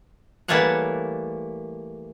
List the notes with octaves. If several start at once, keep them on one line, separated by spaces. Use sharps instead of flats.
E3 G3 A3 A#3 C#5 F#5